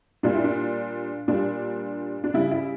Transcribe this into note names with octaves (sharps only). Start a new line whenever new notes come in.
A#2 G3 D4
E4
D4
A#2 G3 D4
D4
C#3 G3 E4
E4